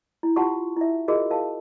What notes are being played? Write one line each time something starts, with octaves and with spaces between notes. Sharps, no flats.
E4
F4 G4 F#5 A5 C6 C#6
E4 E5
F4 F#4 G#4 A#4 D#5
A#4 F5 A5